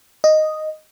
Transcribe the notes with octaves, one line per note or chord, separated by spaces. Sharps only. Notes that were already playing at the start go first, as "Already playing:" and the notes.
D#5